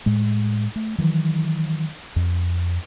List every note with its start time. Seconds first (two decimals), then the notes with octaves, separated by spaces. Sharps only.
0.06 A2 G#3
0.76 A3
0.98 D#3 E3 F#3
2.16 F2